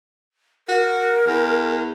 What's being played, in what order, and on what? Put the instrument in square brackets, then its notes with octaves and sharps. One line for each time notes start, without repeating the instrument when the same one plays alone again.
[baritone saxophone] F#4 [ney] A#4
[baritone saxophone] E2